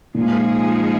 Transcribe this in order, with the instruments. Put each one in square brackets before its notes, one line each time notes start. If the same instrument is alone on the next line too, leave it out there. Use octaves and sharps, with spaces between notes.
[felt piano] A#2 [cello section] F3 G#3 D#4 G#4